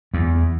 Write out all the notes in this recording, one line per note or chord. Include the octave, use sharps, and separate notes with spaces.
E2